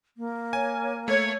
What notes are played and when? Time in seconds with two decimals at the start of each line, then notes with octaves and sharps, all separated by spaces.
0.17 A#3
0.53 C#5 G#5
1.08 A3 C#5 G#6